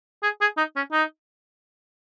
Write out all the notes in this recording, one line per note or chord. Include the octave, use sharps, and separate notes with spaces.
G#4
G#4
D#4
C#4
D#4